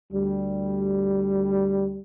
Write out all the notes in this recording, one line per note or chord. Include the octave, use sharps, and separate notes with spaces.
D2 G3